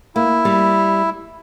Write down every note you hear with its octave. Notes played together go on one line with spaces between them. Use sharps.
A#3 E4
G3